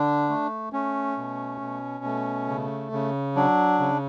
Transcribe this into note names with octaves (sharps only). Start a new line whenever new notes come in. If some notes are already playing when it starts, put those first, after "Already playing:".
Already playing: D3 D4
A3
A3 C#4
B2
B2
A3
C#3
C#3
F#3 D4
C#3